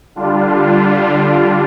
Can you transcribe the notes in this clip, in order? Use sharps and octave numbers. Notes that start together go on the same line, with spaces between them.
D3 G3 D4 F4